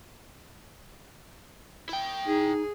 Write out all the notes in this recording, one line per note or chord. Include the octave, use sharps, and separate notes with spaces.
E4 G5
D#4 G#4